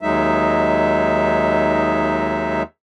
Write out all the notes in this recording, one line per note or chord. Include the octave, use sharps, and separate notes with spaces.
D#2 F#3 G#3 D#4 E5